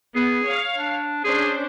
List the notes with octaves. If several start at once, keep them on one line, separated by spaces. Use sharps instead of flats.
B3 G#4
C#5 F5
D4
C#4 D4 G#4 C5